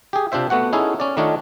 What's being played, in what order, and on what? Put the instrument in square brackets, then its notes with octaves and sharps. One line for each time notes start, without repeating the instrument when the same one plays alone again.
[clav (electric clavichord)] G4 G#4
C3 D4 F4 C5 E5
A3 B3 F#4 F#5
C#4 D#4 E4 G#4 A4
C#4 D5
D#3 A3 D4 D#4 F4 C#5